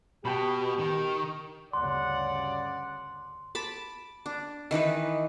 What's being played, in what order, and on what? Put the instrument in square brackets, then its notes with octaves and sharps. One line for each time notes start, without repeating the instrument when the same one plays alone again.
[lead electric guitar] B2 [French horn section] G4 [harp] G5 A5 B5
[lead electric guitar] D#3
[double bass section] D2 G2 C#3 [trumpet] D5 [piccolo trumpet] F#5 [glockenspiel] C6
[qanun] A5 B5 D6
D4
D#3 E3 D#4 B4